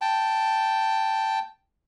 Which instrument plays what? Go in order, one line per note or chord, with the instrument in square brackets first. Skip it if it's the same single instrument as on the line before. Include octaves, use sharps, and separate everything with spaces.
[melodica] G5 A5